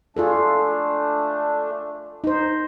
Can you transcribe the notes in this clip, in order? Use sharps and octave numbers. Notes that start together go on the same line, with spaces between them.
A3 D4 F4 G#4 A4
D#4 C5